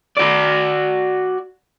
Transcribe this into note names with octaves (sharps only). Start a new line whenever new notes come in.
F#4 D5